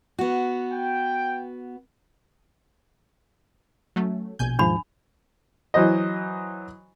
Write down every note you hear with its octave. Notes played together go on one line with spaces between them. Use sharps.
B3 F#4
G5
F#3 A3 C#4
A#1 B2 G#5 G6
D#2 G#2 F3 D4 B5
E3 F#3 C5 D#5